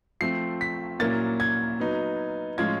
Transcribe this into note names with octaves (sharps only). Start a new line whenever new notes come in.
F3 A3 C4 C7
B6
A#2 F#3 A#3 C#4 E4 A6
G#6
F#3 B3 D#4
A2 F3 G#3 C#4 F4 G#6